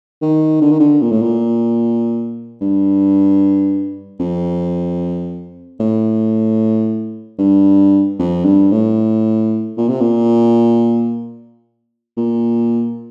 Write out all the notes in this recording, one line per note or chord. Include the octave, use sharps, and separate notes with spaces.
D#3
D3
D#3
D3
A#2
A2
A#2
G2
F2
A2
G2
F2
G2
A2
A#2
C3
A#2
A#2